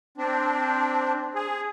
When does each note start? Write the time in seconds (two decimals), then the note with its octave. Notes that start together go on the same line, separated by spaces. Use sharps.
0.18 C4 D4
1.35 G#4